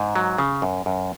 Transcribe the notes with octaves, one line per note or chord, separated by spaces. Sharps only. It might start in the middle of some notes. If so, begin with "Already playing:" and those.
Already playing: G#2
F#3
C#3
F#2
F#2